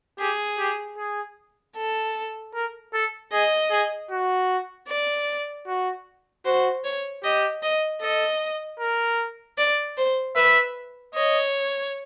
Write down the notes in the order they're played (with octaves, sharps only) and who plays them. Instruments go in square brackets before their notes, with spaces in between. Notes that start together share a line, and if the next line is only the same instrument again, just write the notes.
[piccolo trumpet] G4 [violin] G#4
[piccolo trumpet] G4
G#4
[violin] A4
[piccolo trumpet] A#4
A4
[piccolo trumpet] G#4 [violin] D#5
[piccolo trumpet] G#4
F#4
[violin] D5
[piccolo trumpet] F#4
[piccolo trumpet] F#4 [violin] C5
[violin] C#5
[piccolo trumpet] G4 [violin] D#5
[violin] D#5
[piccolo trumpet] A4 [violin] D#5
[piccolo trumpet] A#4
[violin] D5
C5
[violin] B4 [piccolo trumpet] E5
[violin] C#5 [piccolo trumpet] D#5